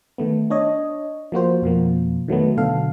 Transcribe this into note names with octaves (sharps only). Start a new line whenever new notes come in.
D#3 A3 B3
D4 C#5 D#5
F3 A#3 F#4 C5
F2 B2 F3 A#3
D#3 F#3 A3 B3
B2 D3 F#3 A4 F5